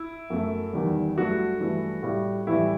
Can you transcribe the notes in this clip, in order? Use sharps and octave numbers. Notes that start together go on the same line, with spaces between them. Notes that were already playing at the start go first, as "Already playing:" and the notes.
Already playing: E4
F#2 F#3 A3
E2 D#3 G3
G2 F#3 A3 F#4
G2 E3 A3
A2 G3
A2 E3 G3 E4